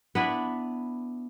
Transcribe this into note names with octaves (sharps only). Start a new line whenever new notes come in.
B3 D4 E4